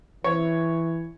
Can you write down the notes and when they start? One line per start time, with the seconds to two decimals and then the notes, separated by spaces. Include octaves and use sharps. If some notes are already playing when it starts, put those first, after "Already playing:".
0.24 E3 C#5